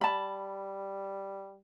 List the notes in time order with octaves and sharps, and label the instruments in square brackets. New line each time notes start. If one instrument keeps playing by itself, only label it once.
[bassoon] G3 [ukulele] A5 B5